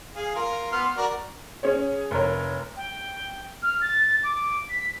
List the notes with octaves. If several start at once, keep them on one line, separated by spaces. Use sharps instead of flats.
G#4 F5
F4 A#4
B3 C6 F6
F#4 A#4 D5
C#4 G#4 C#5
F1 A#4 C#5
G5
F6
A6
D6
B6